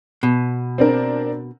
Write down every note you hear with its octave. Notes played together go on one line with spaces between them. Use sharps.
B2
C4 D4 A#4